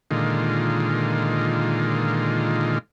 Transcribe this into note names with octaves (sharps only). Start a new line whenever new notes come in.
A#2 D3 D#3 G#3 F4